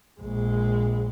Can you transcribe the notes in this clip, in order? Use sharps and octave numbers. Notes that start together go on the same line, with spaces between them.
A#1 G#3